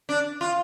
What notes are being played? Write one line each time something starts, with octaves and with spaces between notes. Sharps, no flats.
D4
F4